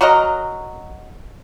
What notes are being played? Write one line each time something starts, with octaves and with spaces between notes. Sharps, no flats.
F#3 F#4 A#4 D#5